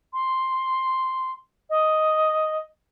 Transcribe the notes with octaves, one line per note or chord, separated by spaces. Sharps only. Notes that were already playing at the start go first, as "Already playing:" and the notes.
C6
D#5